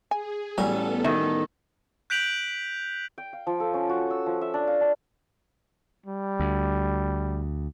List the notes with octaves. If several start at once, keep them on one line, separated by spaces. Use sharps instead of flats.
G#4 G#5
A1 F#3 G3 B3 C#4 A4 G#5
D#3 F#4 E5
F#6 G6 B6 D7 F7 F#7
G5
F5
F3
A4
C#4
F#4
E6
F3
E5
D4
F5
D4
G3
D2